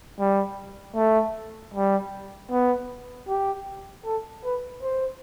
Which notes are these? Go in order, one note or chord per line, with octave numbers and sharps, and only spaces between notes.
G3
A3
G3
B3
G4
A4
B4
C5